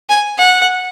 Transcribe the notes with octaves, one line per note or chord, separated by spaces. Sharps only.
G#5
F#5